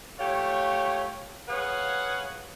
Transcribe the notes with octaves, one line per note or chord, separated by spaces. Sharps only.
A3 F4 G4 C#5
G#4 B4 C#5 F5 F#5